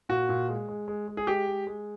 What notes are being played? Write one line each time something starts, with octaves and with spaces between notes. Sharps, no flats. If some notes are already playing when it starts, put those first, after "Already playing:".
A#2 F#4
A#2
G#3
G#3
G#3
G#3
G#4
G#3 G4
G#3
G#3